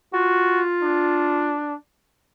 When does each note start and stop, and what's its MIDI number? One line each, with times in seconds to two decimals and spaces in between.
0.14 1.56 65
0.14 0.62 66
0.83 1.75 62